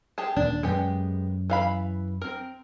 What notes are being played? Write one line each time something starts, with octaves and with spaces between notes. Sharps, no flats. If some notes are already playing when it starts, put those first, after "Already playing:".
G4 G#4 A5
D#1 D4
F#2 G#3 B3 G4
E3 F5 B5
C4 A#4